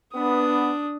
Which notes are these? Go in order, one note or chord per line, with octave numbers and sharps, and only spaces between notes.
B3 D4 D#6